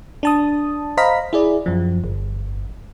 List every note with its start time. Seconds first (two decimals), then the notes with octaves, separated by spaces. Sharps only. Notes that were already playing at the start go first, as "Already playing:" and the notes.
0.23 D4 A5 D#6
0.97 C5 D#5 F5 A#5 B5 B6
1.33 E4 G#4 D5
1.66 F#2 F3
2.04 G1